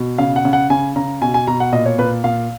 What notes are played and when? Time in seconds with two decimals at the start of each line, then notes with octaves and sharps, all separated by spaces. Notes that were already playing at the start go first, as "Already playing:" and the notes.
Already playing: B2
0.18 C#3 F5
0.36 F#5
0.45 C#3
0.53 F#5
0.70 C#3 G#5
0.96 C#3 A#5
1.21 B2 G#5
1.34 G#5
1.47 B2 A#5
1.60 F#5
1.73 A#2 D#5
1.86 C#5
1.98 A#2 B4
2.24 A#2 F5